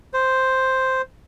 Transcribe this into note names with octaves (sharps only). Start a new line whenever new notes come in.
C5